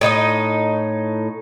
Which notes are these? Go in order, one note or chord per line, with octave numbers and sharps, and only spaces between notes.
A2 D#4 E4 D#5